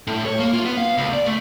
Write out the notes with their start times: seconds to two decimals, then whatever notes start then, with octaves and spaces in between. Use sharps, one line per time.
0.07 A2
0.26 C#5
0.40 A#3
0.54 F4
0.65 B3
0.77 F5
0.98 C#2
1.13 D5
1.26 A3